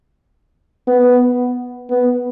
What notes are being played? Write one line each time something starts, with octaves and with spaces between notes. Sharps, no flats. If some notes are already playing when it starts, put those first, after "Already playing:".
B3
B3